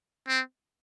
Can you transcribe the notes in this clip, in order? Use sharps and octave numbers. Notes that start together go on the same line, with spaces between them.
C4